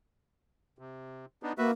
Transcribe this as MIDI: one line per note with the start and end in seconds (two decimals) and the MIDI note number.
0.79 1.26 48
1.43 1.53 59
1.43 1.53 62
1.43 1.53 63
1.58 1.72 58
1.58 1.71 66
1.58 1.71 71
1.58 1.71 76